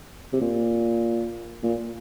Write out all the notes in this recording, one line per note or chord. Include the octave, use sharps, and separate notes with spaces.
C3
A#2
A#2